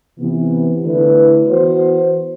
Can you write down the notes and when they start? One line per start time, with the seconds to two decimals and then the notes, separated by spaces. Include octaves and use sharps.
0.19 C3 E3 B3
0.84 D3 A3 E4 B4
1.48 E3 B3 F#4 C5